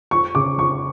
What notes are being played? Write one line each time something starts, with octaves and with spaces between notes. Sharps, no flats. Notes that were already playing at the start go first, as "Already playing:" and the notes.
F2 C#6
C#3 D6
F2 C#6